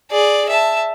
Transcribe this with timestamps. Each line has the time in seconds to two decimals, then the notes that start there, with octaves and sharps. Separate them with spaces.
0.11 G#4 D5
0.49 E5 A5